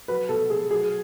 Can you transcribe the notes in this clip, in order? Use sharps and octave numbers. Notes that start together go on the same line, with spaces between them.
F#3 B4
B2 A4
B2 G#4
F#3 G#4